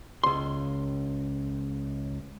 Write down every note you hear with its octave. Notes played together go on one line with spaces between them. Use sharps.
C#2 C6